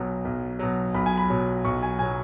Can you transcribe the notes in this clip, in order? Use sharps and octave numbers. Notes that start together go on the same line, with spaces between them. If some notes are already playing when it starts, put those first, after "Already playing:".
Already playing: B1 B2 F#3
B1
B2 F#3
B1 B5
G#5
B5
B2 F#3
B1 C#6
G#5
B2 F#3 G#5